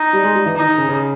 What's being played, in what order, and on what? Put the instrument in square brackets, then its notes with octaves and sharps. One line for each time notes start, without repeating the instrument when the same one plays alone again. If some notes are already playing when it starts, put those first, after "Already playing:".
Already playing: [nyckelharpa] D#4
[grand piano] G3
G#3
G3
E3
[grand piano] D#3 [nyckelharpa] D#4
[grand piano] D#3
C#3
C#3